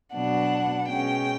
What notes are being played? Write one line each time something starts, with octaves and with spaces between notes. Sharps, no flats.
B2 F#3 B3 D4 F#5
B2 G#3 C#4 G5